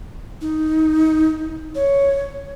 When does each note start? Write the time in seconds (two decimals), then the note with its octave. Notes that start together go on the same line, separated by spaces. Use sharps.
0.41 D#4
1.75 C#5